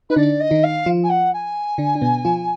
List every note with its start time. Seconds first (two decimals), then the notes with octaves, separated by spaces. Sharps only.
0.09 D#4 B4
0.16 D3 D4 D5
0.40 D#5
0.51 D#3 D#4
0.63 F5
0.86 F3 F4
1.03 G#5
1.09 F#5
1.33 G#5
1.78 D3 D4
1.95 D4
2.02 B2 B3
2.25 F3 F4